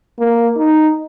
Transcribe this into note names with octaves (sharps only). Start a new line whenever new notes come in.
A#3
D#4